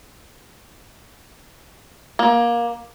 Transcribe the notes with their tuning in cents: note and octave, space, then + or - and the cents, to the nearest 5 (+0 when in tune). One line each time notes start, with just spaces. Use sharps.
A#3 +20